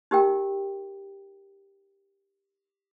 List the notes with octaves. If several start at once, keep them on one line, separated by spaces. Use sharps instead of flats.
D#4 G4 A#4 G5